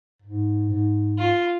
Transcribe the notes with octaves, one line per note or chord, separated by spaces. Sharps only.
G#2
G#2
F4